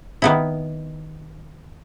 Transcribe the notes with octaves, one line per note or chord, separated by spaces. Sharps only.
D#3 B3 E4